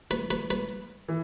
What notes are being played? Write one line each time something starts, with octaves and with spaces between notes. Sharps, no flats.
B4
B4
B4
E3